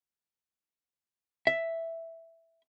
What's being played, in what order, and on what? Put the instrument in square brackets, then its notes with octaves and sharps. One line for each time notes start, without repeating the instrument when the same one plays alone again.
[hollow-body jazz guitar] E5